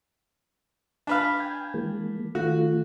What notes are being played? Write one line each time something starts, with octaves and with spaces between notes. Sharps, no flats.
D4 B4 F5
G5 G#5
E3 G#3 A#3
D#3 A3 F4 F#4